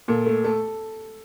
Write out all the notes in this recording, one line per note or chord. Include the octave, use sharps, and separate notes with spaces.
A#2 A4
A3
A3 A4